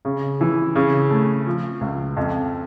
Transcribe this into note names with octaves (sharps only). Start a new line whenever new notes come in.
C#3
E3
C#3
A3
F3
C#2
F2